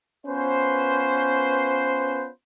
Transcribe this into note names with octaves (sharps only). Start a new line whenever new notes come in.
B3 C#4 F4 B4 C5